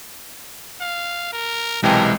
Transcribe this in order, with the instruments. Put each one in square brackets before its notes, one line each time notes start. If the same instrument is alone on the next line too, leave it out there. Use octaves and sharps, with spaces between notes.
[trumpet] F5
A#4
[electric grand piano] B1 C3 E3 [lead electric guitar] G#3 [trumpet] A#4 [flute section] G5 A5